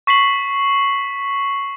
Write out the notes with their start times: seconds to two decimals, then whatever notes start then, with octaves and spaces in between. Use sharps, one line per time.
0.07 C#6 B6 C7 F#7